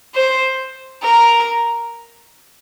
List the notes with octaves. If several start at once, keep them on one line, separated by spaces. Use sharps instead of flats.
C5
A#4